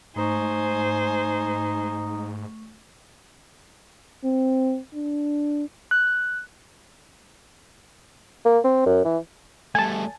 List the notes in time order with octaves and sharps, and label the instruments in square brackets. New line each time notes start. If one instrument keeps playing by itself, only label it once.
[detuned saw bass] G#2 [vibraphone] A3 C#6 [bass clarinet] D#4 [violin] C5 G#5
[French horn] C4
D4
[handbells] F#6
[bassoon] A#3
C4
F#2
E3
[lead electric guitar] G3 A3 [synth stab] G#5 A5